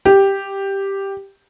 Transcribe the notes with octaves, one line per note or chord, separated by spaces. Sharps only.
G4